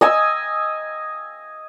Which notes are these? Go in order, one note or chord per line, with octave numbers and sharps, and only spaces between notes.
D#5 G#5 E6